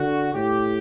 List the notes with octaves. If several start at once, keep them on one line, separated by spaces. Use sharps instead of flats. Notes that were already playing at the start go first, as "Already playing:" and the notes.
Already playing: D3 F#4
A2 G4